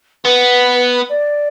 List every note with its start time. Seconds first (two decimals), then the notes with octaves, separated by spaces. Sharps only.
0.24 B3 B4
1.09 D5